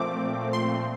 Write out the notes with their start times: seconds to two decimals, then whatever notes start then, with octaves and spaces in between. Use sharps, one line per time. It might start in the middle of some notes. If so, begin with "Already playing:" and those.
Already playing: A#2 F3 A3 C4 D6
0.53 C6